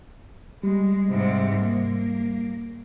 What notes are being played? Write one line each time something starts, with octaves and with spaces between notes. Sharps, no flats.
G3 G#3
G#2 C3
A#3